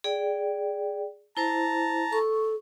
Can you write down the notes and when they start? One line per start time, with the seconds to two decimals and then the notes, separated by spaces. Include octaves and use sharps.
0.04 G#4 D5 G5
1.37 E4 C5 A5 A#5
2.13 A4 C#6